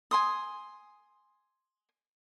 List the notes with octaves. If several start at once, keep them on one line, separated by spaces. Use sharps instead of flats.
G#5 C6 D#6